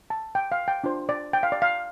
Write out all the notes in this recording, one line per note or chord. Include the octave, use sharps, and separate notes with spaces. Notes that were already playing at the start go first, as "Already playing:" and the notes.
A5
G5
F5
G5
D4 F4 C5
D5
G5
F5
D5
F5